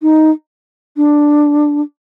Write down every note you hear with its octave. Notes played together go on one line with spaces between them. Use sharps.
D#4
D4